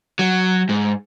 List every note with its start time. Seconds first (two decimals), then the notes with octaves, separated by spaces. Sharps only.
0.19 F#3
0.69 G#2